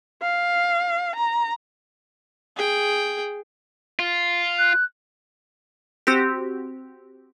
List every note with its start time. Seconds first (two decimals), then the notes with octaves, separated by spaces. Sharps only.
0.22 F5
1.16 A#5
2.56 G#4 G5
3.99 F4
4.58 F#6
6.07 C4 F#4 G4